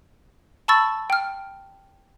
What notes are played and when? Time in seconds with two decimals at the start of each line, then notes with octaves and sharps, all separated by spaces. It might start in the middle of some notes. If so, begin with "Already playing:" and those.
0.68 A5 B5 C#6 E6 A6
1.10 G5 F6